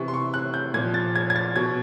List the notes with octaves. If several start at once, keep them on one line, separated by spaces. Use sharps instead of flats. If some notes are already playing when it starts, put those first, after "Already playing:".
Already playing: C3 E3 C#6
C6
C#6
F#6
G6
A#2 F3 G#6
A6
G#6
G#6
A6
B2 G#6